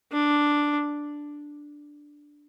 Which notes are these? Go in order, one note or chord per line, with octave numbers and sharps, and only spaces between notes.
D4